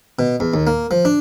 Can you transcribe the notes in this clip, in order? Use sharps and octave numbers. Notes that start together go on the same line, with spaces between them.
B2
E2
D#2
A#3
F3
D4